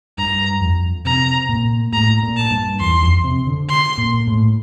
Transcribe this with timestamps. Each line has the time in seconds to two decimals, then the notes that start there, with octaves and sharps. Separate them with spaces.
0.18 G2 A#5
0.61 F2
1.05 C3 A#5
1.49 A#2
1.93 A2 A#5
2.23 A#2
2.37 A5
2.51 G2
2.80 E2 C6
3.03 F2
3.24 C3
3.47 D3
3.69 C6
3.98 A#2
4.27 A2